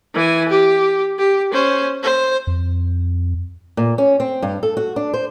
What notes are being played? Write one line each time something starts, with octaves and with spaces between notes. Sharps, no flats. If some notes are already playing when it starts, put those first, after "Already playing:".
E3 G#5
G4
G4
C#4 C5
C5
F2
A#2
C#4
C4
G2
A4
F#4
D4
C5